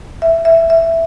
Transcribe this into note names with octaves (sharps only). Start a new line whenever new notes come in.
E5
E5
E5